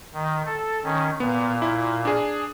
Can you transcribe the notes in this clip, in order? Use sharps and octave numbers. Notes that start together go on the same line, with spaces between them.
D#3
A4
D#3 C#4
A#2 B3
E4
D4 G#4